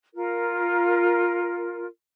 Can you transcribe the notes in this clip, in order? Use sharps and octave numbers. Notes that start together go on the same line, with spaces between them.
F4 A#4